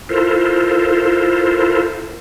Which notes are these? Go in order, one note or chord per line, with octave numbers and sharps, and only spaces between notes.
E4 F4 A4 A#4 C5